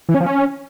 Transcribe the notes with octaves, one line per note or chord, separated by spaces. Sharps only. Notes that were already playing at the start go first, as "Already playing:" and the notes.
E3
C#4
F3
C#4